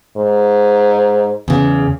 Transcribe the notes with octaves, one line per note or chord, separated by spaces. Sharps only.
G#2
E2 C#3